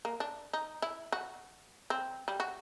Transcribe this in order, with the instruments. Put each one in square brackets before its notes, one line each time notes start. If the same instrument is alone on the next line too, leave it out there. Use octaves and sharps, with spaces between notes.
[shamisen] A#3
D4
D#4
E4
F#4
C4
G3
F#4